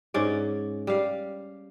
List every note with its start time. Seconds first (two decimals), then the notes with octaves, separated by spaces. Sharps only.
0.14 G#2 C#4 D5
0.87 G3 F5